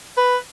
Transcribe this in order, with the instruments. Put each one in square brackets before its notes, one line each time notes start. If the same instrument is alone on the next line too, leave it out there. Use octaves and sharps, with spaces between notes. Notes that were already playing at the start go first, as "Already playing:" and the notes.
[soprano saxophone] B4